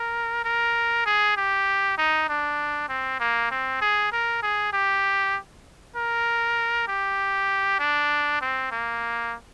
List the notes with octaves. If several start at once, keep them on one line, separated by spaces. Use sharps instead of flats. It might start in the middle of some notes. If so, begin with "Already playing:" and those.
Already playing: A#4
A#4
G#4
G4
D#4
D4
C4
A#3
C4
G#4
A#4
G#4
G4
A#4
G4
D4
C4
A#3